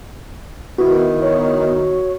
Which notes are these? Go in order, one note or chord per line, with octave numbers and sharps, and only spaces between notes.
D#3 B3 E4 F#4
C#5